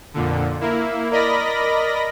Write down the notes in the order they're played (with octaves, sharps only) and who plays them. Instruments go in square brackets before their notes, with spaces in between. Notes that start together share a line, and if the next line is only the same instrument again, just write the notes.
[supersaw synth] F2 A#2 D3
A#3 E4
A#4 D5 D#5 B5 A#6